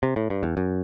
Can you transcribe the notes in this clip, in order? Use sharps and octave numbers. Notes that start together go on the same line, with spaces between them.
C3
A2
G2
E2
F#2